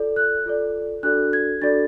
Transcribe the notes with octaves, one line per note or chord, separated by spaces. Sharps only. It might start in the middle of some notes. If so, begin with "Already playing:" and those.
Already playing: F4 A4 D5
F#6
F4 A4 D5
D4 F#4 A4 D5 F#6
G#6
D4 F#4 A4 D5 A6